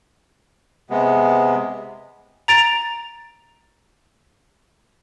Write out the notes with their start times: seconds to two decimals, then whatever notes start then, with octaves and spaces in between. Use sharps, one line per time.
0.90 C3 G#3 B3
2.48 A#5 A6 D7 F7